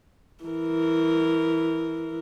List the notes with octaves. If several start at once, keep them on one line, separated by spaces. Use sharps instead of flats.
E3 A#4